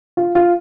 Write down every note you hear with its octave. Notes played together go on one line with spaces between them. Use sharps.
F4
F4